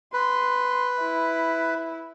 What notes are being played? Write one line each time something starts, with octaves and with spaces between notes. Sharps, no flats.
B4 C6
E4